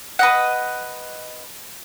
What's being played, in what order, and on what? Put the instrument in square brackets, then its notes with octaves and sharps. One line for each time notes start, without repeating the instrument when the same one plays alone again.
[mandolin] B4 D#5 F#5